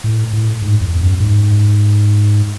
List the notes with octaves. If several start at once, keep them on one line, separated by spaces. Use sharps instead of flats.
A2
A2
G#2
E2
F#2
G#2